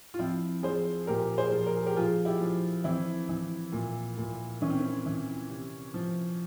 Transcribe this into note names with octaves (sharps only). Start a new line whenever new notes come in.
F4
F3 C4 E4
F3 G#4 C5
A#2 G4 A#4
G#4 C5
F3
A#4
G#4
G4 A#4
F3 F4 G#4
E4 G4
F3
E3 C4 E4
E3
A#2
A#2
E3 C#4
C4
C#4
E3
C3
F3